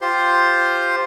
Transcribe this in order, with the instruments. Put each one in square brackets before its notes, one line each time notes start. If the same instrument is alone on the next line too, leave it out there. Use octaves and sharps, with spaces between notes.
[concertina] F4 G4 C5 C6